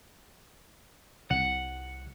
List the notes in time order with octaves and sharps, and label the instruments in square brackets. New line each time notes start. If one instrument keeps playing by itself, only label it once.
[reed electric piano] C2 [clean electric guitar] F#5